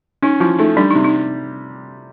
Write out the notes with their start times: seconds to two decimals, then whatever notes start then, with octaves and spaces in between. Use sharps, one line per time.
0.22 C#4 D#4
0.40 F3 E4
0.59 A3 D#4
0.77 G3 D4
0.91 C3 D#4
1.05 D#4